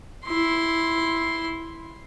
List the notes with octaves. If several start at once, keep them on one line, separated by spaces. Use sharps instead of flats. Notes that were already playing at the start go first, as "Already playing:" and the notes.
E4 C6